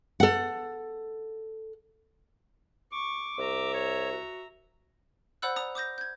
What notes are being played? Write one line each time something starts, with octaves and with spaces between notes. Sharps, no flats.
A4 F#5
C#6 D6
C2 E5 A#5
C#5
F#4
C5 D5 F#5 B5 E6 F#6
D5 A#5 D#6
D6 D#6 G6 A#6
G6 G#6